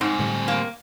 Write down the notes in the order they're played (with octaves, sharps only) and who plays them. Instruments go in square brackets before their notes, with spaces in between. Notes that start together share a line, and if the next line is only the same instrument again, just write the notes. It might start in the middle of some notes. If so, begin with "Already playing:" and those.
[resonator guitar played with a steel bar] G#2 [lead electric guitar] C4 G#4
[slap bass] A2 D3 G3
[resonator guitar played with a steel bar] A#3